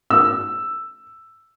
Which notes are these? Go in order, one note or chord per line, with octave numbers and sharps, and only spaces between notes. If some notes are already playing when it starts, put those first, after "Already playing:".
E6